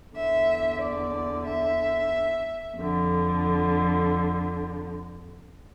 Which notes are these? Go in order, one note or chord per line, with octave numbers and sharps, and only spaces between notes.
E2 D3 E5
D5
E5
F2 D3